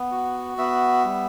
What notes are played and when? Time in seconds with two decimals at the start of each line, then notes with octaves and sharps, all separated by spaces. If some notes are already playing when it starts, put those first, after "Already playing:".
Already playing: B3
0.11 F#4
0.58 B3 E5
1.04 G3